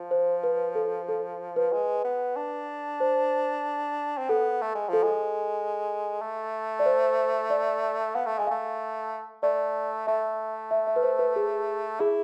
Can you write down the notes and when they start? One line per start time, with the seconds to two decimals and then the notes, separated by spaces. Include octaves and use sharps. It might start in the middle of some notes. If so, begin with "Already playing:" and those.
Already playing: F3
0.11 C5
0.44 B4
0.75 A4
1.09 A4
1.56 B4
1.72 G#3
2.04 B3
2.36 D4
3.00 C5
4.18 C4
4.29 B3 A4
4.61 A3
4.75 G#3
4.89 F3 A4
5.03 G#3
6.21 A3
6.79 D5
6.86 C5
7.50 D5
8.15 B3 F5
8.26 A3
8.38 G#3 G#5
8.47 A3 F5
9.43 A3 D5
10.07 A3 E5
10.71 E5
10.87 E5
10.96 B4
11.03 C5
11.19 B4
11.36 G#4
12.00 E4 G#4